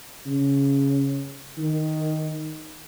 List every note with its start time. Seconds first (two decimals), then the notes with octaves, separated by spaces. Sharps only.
0.27 C#3
1.58 D#3